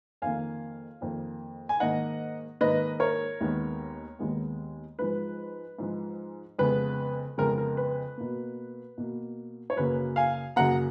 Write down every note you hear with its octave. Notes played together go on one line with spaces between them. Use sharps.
F2 D#3 A#3 F5 G#5
F2 D#3 A#3
G#5
G#2 D#3 A#3 D#5 F#5
G#2 D#3 A#3 B4 D#5
A#4 C#5
D#2 D#3 G#3 B3
D#2 D#3 G#3 B3
G#2 F3 G#3 B4
G#2 F3 G#3
F2 C#3 G#3 B3 B4
F2 C#3 G#3 B3 A#4
A#4
B4
B2 A#3
B2 A#3
C#5
F#2 C#3 F#3 A#3 B4
F5 G#5
F#2 C#3 F#3 A#3 F#5 A#5